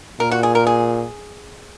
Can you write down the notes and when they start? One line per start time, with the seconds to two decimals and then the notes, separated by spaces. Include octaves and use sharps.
0.20 A#2 A#4
0.31 F#4
0.43 G#4
0.55 A#4
0.67 G#4